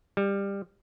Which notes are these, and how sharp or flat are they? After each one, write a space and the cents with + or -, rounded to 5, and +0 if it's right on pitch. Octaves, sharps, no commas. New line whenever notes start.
G3 +20